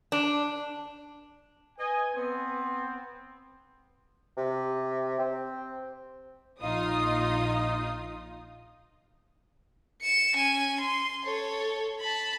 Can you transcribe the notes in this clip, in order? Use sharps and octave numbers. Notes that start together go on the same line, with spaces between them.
D4
B4 D#5 G#5
B3 C4
C3
C4
A#1 D#4 F4 D#6
C#7 E7
C#4 G#5
C6
A4 C#5
A5 B5